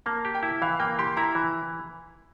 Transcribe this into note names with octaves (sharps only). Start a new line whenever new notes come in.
A#3 A5
G4
G5
E4
E3 F5
A#3 G5
G4 C6
E4 A#5
E3